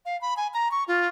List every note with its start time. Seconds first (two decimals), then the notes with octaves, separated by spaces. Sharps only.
0.06 F5
0.21 B5
0.37 G#5
0.54 A#5
0.71 C#6
0.88 F4